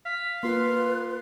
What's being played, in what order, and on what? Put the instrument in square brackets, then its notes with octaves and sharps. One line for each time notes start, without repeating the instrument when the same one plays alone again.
[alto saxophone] F5 [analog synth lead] B6
[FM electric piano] A#3 F4 A#4 [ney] B4 [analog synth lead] C6